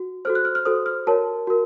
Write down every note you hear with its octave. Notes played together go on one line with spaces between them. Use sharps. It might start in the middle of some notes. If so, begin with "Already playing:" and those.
Already playing: F#4
F#4 A4 C5 F6
F#6
F6
F6
F#4 A4 C5 D#6
F6
F#4 A#4 C#5 A5
F#4 A#4